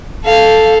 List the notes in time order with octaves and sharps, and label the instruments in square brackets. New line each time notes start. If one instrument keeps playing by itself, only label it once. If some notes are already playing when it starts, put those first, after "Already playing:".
[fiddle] A4 F5